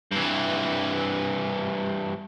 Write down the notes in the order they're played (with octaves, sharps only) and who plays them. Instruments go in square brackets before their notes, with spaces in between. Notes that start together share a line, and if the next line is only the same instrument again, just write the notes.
[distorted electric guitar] G2 E3